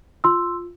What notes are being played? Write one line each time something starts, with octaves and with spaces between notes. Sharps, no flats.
F4 C6 E6